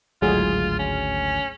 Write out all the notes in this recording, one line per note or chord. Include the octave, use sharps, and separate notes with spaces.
G#1 D2 A2 F#3 G#3 F4 G#4
C#4